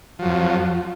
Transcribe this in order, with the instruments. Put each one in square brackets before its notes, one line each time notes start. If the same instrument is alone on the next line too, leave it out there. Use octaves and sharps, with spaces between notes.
[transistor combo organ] F3
F#3
F2